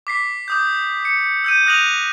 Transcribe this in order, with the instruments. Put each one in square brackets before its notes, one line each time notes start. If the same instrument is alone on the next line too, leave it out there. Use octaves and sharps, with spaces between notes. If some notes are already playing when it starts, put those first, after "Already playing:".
[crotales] D6 B6 C7
D6 D#6 G6
C#7
E6 G6 D#7
D#6 F#6 A#6 D#7 F7 F#7